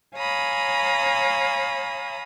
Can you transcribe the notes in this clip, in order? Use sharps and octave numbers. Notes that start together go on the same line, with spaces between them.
C#5 F5 G#5 A#5 B5 D#6